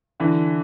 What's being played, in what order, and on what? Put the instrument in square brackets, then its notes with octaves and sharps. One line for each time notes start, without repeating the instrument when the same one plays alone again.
[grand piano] D3 E3